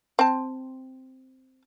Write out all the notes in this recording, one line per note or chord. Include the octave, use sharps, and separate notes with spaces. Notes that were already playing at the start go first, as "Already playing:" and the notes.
C4 A5